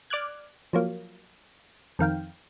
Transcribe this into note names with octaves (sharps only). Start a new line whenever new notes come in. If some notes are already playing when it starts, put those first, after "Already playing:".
D5 D6 F6 F#6 G#6
F3 F#3 A#3
F2 D#3 F5 G5